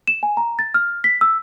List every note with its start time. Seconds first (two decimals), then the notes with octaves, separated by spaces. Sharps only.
0.07 E7
0.23 G#5
0.37 A#5
0.59 A6
0.74 F6
1.04 B6
1.21 E6